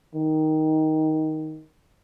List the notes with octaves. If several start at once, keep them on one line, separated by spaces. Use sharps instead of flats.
D#3